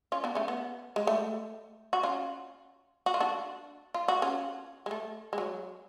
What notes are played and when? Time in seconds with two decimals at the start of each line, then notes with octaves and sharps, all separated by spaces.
0.12 C#4 F4
0.24 B3 D4
0.35 A3 C#4
0.48 B3
0.96 G#3
1.07 A3
1.93 F#4
2.03 C#4 F4
3.06 F#4
3.14 F4
3.20 D4 F#4
3.94 F4
4.08 F#4
4.22 C#4 F4
4.86 G#3
4.91 A3
5.33 G#3
5.38 F#3